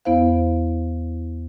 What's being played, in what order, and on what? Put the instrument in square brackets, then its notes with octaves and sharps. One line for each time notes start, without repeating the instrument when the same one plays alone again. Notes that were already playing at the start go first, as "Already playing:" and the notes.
[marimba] E2 B3 E4 C5 F5